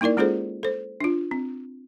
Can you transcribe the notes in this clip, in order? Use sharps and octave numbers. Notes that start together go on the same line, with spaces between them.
A#3 D#4 E4 A#4 D5
G#3 C#4 F4 G#4 A4 C5
A4 C5
D4 F4
C4